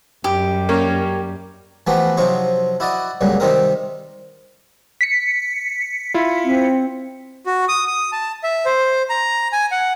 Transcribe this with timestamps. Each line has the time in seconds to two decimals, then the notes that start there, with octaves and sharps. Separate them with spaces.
0.24 F#2 G3 G4
0.69 A#3 C#4
1.87 E3 F3 A3 B3 F#4 G4
2.17 C3 F3 F#3 D#4 C5 C#6
2.80 E4 F#4 D5 D#5
3.21 C#2 G2 A#2 F#3 G3
3.40 C3 D#3 G3 C4 D#4 A#4
5.01 B6 C#7
6.14 E4 F4
6.44 C4
7.46 F#4
7.69 D#6
7.87 D#6
8.13 A5
8.44 E5
8.66 C5
9.10 A#5
9.53 G#5
9.71 F#5